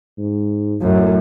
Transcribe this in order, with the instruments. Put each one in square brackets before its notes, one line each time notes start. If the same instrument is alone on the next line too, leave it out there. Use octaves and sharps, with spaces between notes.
[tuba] G#2
[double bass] F#2 [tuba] A2